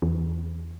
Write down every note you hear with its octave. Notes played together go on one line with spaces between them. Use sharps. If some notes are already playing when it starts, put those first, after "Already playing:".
E2